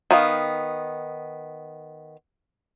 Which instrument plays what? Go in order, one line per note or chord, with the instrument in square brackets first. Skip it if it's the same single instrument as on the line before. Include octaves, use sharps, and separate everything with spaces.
[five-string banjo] D#3 B3 F5